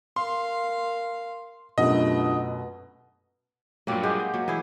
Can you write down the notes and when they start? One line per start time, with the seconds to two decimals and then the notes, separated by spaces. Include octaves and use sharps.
0.16 A#4 F5 C6
1.78 F#2 B2 A3 D4 F4 G4 B4 D#5
3.87 G2 A#2 F#3 A#3 G4
4.03 G#3 G4 G#4 F#5
4.20 G6
4.34 F#3 A#3
4.48 E3 E4 G#4